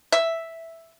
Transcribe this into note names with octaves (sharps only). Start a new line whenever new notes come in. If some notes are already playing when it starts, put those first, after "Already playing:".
E5